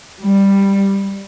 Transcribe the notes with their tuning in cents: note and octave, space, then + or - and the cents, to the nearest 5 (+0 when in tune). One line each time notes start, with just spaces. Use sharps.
G3 +5